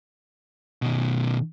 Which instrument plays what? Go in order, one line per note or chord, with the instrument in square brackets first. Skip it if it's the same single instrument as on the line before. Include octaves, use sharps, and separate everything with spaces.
[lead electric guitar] B2 D#3